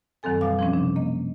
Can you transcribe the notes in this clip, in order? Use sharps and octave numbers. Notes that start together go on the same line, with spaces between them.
F#2 D#3 F#3 C4 A4 G#5
B2 E3 G3 F5 D6
F3 C4 C#4
C3 D4
A#3 D#5